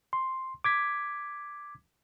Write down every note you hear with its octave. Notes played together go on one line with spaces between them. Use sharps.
C6
D6 G#6 B6